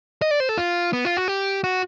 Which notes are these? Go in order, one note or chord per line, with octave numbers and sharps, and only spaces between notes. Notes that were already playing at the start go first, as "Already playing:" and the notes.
D#5
D5
C5
A4
F4
B3
F4
F#4
G4
F#4